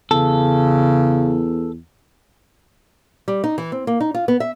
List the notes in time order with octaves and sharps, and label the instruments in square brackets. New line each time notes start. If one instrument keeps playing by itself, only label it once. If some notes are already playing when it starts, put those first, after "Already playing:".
[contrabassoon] E2 [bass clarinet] C#3 [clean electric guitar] A4
[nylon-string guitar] G3
D#4
E3
C4
A#3
D#4
F4
B3
E5